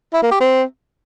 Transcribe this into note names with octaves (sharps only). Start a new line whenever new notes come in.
E4
A#3
G4
C4